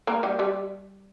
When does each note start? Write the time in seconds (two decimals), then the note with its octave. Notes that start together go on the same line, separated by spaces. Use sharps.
0.07 A#3 A#4
0.23 G3 G4
0.39 G3 G4